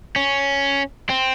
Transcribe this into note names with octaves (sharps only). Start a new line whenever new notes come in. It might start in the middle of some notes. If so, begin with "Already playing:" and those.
C#4
C4